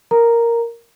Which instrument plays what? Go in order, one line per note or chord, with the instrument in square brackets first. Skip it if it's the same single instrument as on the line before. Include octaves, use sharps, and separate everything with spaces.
[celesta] A#4 A#5